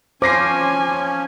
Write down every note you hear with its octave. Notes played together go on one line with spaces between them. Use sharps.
F3 C#4 C5 G#5 D6 A#6 C7